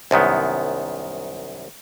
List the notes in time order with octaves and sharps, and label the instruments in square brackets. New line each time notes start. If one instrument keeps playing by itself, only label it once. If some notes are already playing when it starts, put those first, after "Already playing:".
[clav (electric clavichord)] C2 F#2 D#3 B3